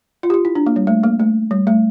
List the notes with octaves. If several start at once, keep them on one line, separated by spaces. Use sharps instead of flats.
F4
G4
F4
E4
D4
A#3
G3
A3
A#3
A3
G3
A3